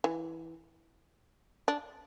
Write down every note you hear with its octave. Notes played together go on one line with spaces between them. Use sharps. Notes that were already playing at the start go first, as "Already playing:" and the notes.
E3
D4